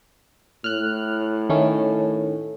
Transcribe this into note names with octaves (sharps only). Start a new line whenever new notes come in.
A2 F6 F#6
D#3 A3 C#4